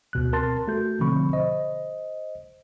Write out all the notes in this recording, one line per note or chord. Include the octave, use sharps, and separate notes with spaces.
D2 B2 F#6
C4 A#4 A5 C6 A6
A3 F#4 A4 G6
B2 D3 F3 C4 B5 C#6
C5 D#5